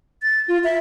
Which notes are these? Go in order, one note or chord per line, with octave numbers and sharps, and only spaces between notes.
A6
F4
E5